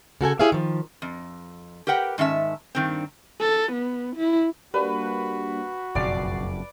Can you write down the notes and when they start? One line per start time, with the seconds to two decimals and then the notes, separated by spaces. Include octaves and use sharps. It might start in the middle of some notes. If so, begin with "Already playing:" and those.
0.21 C#3 F#4 A4 G#5
0.39 E4 G4 G#4 C#5 E5 F5
0.52 D#3 F3
1.02 F2
1.87 G4 A#4 B4 F#5 G5
2.18 G#2 D#3 C#4 E5 A5
2.75 G2 D#3 C4
3.41 A4
3.72 B3
4.16 E4
4.74 G3 A#3 D4 F#4 B4
5.95 F#1 B1 F2 D5 D6 C7